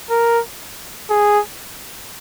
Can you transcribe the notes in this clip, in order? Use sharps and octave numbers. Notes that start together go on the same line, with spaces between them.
A#4
G#4